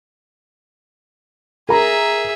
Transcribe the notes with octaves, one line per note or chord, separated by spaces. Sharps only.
G#4 A#4 E5 A#5